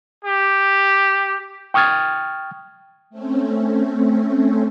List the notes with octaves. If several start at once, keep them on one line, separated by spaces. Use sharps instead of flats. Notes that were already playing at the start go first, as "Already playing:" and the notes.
G4
G5 C#6 D#6 F6 G#6 A6
A3 C4 C#4